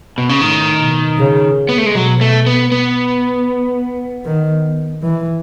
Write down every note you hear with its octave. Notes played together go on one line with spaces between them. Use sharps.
B2
C#3
A2 D#3
B2
C#3
B3
A3
G#3
B2 F#3
A3
B3
B3
D#3
E3